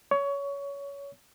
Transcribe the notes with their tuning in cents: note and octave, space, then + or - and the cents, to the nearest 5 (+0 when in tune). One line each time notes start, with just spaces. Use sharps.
C#5 +20